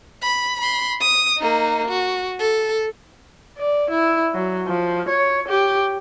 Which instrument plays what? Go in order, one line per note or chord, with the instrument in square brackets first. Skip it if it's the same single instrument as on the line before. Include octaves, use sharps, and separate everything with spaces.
[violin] B5
B5 C6
D#6
A#3 D#4
F#4
A4
[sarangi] D5
E4
F#3
F3
C#5
G4